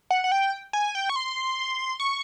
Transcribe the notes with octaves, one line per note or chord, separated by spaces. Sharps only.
F#5
F#5
G5
G#5
G5
C#6
C6
C#6